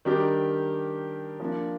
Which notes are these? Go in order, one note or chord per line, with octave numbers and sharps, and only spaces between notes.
D#3 G3 D4 G4 A#4
F3 A#3 D4